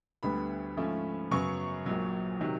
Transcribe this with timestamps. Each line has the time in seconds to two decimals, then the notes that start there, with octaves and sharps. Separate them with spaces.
0.23 D2 D3 G3 B3 B5
0.77 G#2 F3 A3 C#4
1.31 F#2 C#3 F#3 B3 C#6
1.86 A#1 A#2 F#3
2.41 C3 D#3 F#3